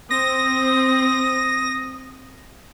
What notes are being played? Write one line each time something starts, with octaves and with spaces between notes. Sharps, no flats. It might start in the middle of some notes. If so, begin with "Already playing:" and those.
C4 D#6 A#6